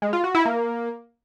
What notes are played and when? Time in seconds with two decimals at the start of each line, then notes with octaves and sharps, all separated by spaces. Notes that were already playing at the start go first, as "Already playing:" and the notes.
0.02 G#3
0.13 F4
0.24 F#4
0.35 E4
0.45 A#3